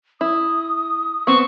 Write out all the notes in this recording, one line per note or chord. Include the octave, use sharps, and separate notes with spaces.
E4 D#6
B3 C4 C#6